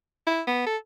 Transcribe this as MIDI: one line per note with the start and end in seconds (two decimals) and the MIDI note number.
0.27 0.42 64
0.47 0.64 59
0.66 0.77 69